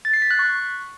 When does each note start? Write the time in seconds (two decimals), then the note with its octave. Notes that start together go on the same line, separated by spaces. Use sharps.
0.05 A6
0.13 C7
0.22 B6
0.31 F#6
0.39 C#6